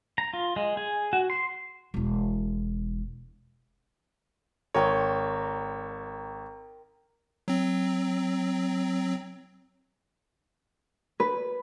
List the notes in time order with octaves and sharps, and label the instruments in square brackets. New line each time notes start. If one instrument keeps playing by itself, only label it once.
[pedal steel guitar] A#5
F4
G#3
G#4
F#4
C6
[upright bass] E1 E4
[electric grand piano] G#1 C#5 [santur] A#4 G5 C6
[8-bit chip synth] F#3 C4
[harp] B4